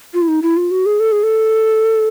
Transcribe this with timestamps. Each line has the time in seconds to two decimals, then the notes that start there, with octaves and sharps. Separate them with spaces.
0.14 F4
0.22 E4
0.28 D#4
0.43 E4
0.57 F4
0.71 F#4
0.86 G#4
1.00 A4
1.12 G#4
1.23 A4